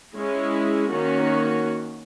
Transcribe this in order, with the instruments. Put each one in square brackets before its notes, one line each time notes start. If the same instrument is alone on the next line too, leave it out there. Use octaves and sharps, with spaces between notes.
[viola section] G#3 C#4 E4 G#4
D#3 A#3 C#4 F#4